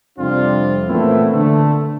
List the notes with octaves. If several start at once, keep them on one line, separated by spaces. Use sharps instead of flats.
F2 C3 G3 C4 D4 F4
A#2 E3 A3 B3 C4 E4
D3 A3